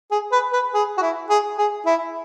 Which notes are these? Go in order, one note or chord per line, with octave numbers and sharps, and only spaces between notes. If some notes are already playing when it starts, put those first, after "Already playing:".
G#4
B4
B4
G#4
F#4
E4
G#4
G#4
E4